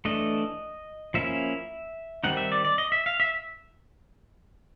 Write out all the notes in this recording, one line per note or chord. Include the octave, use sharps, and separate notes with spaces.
E3 A3 D4 D#5
F3 A#3 C#4 E4 E5
D#3 G3 C4 D#4 F#5
E5
D5
D5
D#5
E5
F5
E5